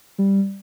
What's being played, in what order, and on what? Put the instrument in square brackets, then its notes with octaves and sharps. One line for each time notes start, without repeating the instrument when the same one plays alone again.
[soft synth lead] G3